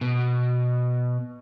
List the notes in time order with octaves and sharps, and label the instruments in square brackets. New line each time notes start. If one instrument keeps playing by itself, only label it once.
[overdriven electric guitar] B2